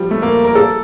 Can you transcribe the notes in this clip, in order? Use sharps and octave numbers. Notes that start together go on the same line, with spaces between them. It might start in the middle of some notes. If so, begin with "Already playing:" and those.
Already playing: F3 G3
A3
A#3
A#4
A4